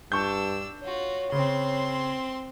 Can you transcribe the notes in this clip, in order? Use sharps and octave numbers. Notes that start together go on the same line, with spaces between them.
G2 D4 A5 C#6 E6 G6
F4 F#4 C#5
C#3 C4 C6